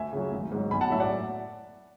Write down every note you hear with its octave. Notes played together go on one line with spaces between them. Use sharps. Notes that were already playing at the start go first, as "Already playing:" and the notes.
Already playing: D2 E5 G#5
C#3 F#3
G#1
G#2 F#3
B1 G#5 B5
F#5 A5
A2 F#3 E5
D5 F#5